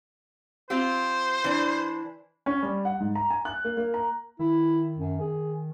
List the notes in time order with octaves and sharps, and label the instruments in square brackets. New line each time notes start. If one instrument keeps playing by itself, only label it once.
[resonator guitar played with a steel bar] C4 F4 G4 [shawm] C5
[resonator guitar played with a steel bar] E3 D4
[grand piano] C#4
G3
F#5
G#2
A#5
G#5
F#6
A#3
A#3
A#5
[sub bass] D#3 [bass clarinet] E4
[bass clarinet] F#2
G#4